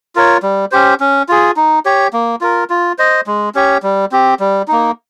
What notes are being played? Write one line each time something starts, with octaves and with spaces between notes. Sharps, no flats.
F4 A#4 C#5
G3
C#4 G4 C5
C#4
F4 G#4
D#4
G4 C#5
A#3
F4 A#4
F4
C5 D#5
G#3
C#4 G4 C#5
G3
C4 G4
G3
A#3 D#4